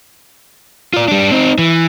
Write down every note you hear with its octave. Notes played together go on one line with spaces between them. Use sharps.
F4 D5
G3 D4
C4 D#4
E3